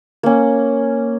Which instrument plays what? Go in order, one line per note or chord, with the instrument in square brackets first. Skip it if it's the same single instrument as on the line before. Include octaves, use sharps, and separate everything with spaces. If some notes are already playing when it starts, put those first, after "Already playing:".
[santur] A#3 C#4